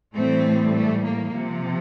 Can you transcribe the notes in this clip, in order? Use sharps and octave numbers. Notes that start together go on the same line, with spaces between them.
A2 E3 G3 A3 C4
A3
A#3
C3 F3